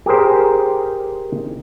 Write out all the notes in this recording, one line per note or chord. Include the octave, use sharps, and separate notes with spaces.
G4 G#4 A#4 C5